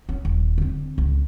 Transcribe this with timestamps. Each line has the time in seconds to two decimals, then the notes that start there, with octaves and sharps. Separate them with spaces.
0.09 C#4
0.25 D#1
0.58 D3 C4
0.98 C#2